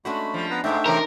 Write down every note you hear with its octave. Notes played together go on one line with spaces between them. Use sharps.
G#3 A3 C#4 D4 F#4 B5
F3 G3
B3 B4 A#5
G#2 A3 D4 D#4 C5 E5 G5
C3 E3 C#4 A#4